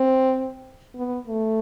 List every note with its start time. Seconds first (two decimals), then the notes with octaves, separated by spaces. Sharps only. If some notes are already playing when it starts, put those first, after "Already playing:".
Already playing: C4
0.96 B3
1.27 A3